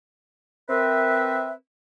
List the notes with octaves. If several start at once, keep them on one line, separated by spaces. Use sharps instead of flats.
C4 A#4 B4 E5